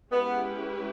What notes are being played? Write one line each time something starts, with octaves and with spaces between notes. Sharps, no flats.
G#3 B3 C#4 E4 G4 B4